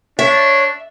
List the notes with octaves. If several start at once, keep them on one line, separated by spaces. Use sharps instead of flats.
D4 C#5 E5